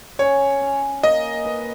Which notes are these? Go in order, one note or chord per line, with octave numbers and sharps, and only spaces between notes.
C#4 C#5
C#4
A#3 D#5
B4